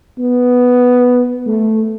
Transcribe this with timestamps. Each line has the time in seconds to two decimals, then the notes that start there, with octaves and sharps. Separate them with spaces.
0.19 B3
1.46 A3